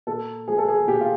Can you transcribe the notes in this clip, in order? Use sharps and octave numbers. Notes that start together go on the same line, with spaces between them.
A#2 A4
F3 G#3 G#4
A4
G#4
A#2 G4
F4